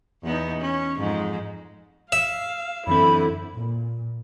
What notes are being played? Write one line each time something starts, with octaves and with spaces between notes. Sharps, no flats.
E2 B3 D#4
C#4
F2 G#2
E5 F5
F#2 D3 E3 C4 E4 B5
A#2